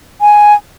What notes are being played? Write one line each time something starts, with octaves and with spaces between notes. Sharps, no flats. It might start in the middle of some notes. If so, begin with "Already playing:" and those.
G#5